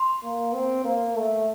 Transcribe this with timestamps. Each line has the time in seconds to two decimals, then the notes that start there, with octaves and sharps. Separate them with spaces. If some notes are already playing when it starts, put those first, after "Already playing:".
Already playing: C6
0.23 A#3
0.53 C4
0.85 A#3
1.16 A3